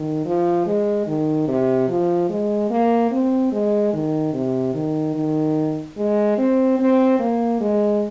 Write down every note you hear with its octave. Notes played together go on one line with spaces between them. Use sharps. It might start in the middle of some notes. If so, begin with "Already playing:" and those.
Already playing: D#3
F3
G#3
D#3
C3
F3
G#3
A#3
C4
G#3
D#3
C3
D#3
D#3
G#3
C4
C4
A#3
G#3